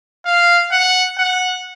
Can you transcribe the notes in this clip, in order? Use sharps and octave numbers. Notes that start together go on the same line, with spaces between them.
F5
F#5
F#5